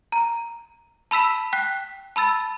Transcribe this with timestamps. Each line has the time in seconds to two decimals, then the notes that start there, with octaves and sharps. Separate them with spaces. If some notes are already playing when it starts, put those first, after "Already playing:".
0.12 A#5
1.11 A5 B5 E6 B6 E7
1.53 G5 F#6 B6
2.16 A5 B5 E6 A6